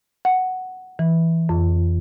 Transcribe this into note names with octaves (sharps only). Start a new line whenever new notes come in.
F#5
E3
F2